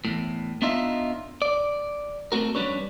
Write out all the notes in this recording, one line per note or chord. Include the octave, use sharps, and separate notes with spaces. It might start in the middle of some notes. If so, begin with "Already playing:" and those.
E2 A2
B3 D4 D#4 F4 D#5 E5
D5
A3 A#3 C4 F#4 A#4
F2 G3 C#4 D4 B4 C#5